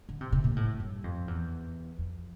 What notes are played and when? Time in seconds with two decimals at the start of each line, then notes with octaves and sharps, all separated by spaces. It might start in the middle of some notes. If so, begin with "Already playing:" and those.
0.09 D3
0.21 C3
0.32 C3
0.44 A#2
0.56 A2
0.80 G2
1.04 F2
1.28 E2
1.99 F2